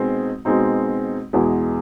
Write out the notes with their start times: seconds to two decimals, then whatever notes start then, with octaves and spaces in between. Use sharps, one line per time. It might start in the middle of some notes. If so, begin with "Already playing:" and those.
Already playing: B2 G#3 C4 D#4
0.45 B2 G#3 C4 D#4
1.33 E2 B2 G#3